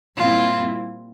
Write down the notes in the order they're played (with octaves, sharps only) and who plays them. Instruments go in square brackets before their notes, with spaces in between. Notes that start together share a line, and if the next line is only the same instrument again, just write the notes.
[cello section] A#2 G3 C4 E4 [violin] F4